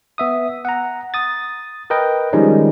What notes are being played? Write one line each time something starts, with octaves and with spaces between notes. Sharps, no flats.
B3 E5 D#6
F#5 A#5
D#6 A6
A#4 B4 D#5 G5
D#3 F3 G3 G#3 C#4 D#4